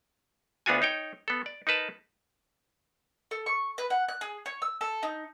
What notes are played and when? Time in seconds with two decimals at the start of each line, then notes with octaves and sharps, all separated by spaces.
0.66 D2 B3 D4 F4 F#4 G#5
0.82 D#4 C#5 G5
1.28 B3 A4
1.46 D5
1.67 D#4 A#4 B4 A5
3.31 A4
3.46 C#6
3.78 B4
3.90 F#5
4.09 F#6
4.21 G#4
4.46 C#5
4.62 E6
4.81 A4
5.03 D#4